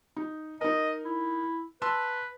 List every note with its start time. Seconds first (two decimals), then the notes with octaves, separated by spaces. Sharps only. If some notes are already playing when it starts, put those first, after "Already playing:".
0.17 D#4
0.61 D#4 A#4 D#5
1.05 E4
1.82 B4 A5 C6 E6